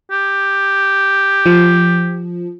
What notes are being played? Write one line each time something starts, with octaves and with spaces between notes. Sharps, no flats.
G4
F3